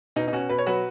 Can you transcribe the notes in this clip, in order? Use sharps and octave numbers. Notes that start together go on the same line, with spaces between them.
B2 D#4
D#4
B2 C#4 F#4
B2 B4
C#5
F#3 F#4 B4